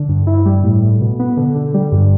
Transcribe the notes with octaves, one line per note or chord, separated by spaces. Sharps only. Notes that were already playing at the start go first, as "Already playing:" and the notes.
Already playing: D3
G2
E4
G3
A2
A2
B2
B3
D3
D3
G3
G2